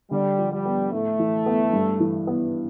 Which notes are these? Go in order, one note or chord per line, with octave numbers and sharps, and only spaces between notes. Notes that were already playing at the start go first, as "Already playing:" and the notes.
D3 G3
F3
G3
B3
A2 A3
E3
B3
G2
E3
B3